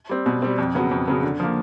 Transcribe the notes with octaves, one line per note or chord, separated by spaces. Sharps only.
G3 C4
B2
G3 C4
F2
C#3 F#3 B3
F2
C#3 F#3 B3
D3
F3 A#3